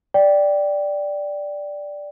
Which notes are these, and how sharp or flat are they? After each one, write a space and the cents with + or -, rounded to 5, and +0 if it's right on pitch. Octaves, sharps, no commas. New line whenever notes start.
D5 +0 G5 -5